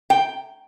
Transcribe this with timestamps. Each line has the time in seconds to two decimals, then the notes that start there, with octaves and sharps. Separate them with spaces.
0.10 G5